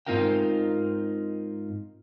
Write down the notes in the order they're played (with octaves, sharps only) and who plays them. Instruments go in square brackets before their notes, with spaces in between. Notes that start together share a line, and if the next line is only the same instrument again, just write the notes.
[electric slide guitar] G#2 C4 D#4 F4 A#4 G5